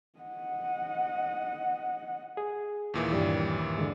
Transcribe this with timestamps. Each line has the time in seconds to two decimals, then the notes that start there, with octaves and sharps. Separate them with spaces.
0.19 D#5 F#5
2.37 G#4
2.94 D#2 A#2 E3
3.13 G2 G3
3.78 D3 G#3